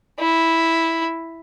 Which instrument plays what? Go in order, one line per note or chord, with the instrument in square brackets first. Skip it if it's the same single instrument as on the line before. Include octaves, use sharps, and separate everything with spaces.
[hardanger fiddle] E4